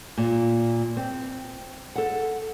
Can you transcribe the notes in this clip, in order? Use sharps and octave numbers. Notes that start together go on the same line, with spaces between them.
A#2
C4
A4 F#5